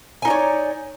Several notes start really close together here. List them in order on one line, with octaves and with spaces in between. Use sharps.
G#5 D#4 D5 C#5